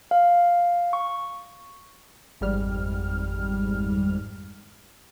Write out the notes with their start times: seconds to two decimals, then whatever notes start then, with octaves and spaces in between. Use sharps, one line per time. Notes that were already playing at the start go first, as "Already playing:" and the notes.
0.11 F5
0.93 C#6
2.41 G#1 F2 G#2 G3 F6